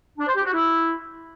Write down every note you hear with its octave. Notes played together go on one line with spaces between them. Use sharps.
D4
C5
G4
F#4
E4